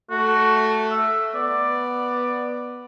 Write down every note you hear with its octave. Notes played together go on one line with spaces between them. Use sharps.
A3 F#4
E5
B3 D5